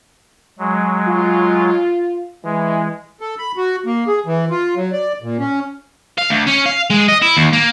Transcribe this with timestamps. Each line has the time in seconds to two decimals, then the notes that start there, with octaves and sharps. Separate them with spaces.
0.59 F#3 G#3
1.07 F4
2.44 E3 G#3
3.21 A4
3.39 B5
3.57 F#4
3.86 A#3
4.08 G#4
4.26 E3
4.50 F4
4.76 F#3
4.92 D5
5.22 A#2
5.39 C#4
6.18 F5
6.30 D2
6.47 C#4
6.66 F5
6.90 G#3
7.08 D#5
7.22 E4
7.37 D#2
7.53 A#3